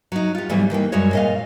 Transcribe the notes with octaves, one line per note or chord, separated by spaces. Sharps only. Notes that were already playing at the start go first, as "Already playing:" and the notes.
F#3 D#4
F4 G4
G#2 B2 E3 F#3 G3 A3
D#3 E3 A#3 G5
F#2 G3 G#3 F#4 G#4 C#5
A#2 D#5 F5